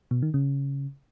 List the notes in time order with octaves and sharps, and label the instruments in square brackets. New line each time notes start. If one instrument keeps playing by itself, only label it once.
[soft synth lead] B2
D#3
C#3